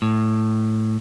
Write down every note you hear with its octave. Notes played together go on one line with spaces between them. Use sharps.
A2